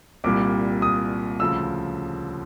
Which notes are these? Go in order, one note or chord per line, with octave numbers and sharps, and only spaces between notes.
C2 A#2 G3 D6
D#6
D2 C#3 F3 E6